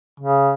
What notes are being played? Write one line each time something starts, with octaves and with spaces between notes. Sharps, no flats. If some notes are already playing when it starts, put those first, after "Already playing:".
C#3